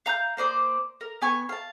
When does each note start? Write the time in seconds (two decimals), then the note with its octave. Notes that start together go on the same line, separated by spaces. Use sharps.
0.06 F5 A#5 E6 G6
0.37 A#3 C5 D5 D#6
1.01 A#4
1.21 B3 G#5 C#6
1.49 F5 A5